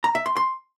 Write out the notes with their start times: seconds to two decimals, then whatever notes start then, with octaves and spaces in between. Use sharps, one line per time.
0.04 A#5
0.15 E5
0.26 C6
0.37 C6